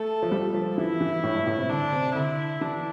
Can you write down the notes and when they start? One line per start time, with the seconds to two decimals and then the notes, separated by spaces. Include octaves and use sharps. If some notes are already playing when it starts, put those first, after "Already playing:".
Already playing: A3 A4
0.22 F3
0.31 G3
0.54 F3
0.78 E3 E4
1.01 E3
1.23 A2
1.35 G2
1.46 A2
1.58 C3
1.69 D3 D4
1.92 C3
2.15 D3 E4
2.61 E3 D4